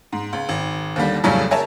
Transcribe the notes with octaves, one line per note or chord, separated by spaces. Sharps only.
G#2
C#2
G#1
D#2 D3 G3
F2 A2 C#3 F#3 G3 C#4
G#4 A#4 C#5 E5 G#5 A5